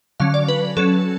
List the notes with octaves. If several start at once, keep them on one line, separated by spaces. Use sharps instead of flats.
D3 F#3 C#4 F5
D5
B4
F#3 C#4 A4